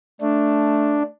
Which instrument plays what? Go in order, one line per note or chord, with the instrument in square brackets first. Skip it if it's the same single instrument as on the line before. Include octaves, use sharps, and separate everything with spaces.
[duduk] A3 [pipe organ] D4